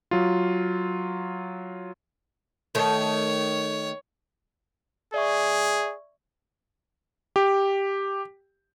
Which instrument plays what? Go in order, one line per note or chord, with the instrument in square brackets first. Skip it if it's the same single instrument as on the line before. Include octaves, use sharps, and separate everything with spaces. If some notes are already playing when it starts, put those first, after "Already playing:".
[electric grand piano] F#3 F4
[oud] D#3 A3 [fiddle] C#5
[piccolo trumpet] G#4 [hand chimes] D5 E5 C#6
[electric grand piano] G4